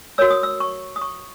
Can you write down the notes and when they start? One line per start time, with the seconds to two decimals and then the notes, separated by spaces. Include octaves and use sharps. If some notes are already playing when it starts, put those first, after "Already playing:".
0.18 F#4 A#4 C#5 E6
0.31 D#6
0.43 E6
0.60 C#6
0.96 D#6
1.02 C#6